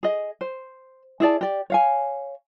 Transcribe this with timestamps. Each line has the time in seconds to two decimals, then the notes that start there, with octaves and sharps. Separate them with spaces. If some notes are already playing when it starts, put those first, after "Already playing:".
0.03 G#4 D#5
0.41 C5
1.20 E4 G#4 D5 A5
1.41 G4 D5
1.70 C#5 F5 G#5